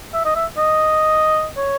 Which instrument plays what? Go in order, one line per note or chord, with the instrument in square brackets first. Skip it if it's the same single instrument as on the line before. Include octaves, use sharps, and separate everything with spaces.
[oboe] E5
D#5
E5
D#5
C#5